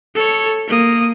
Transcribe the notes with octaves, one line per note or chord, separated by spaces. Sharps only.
A4 C#5
A#3 D#6